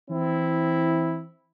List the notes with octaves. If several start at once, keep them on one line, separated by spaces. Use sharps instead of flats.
E3 C4 E4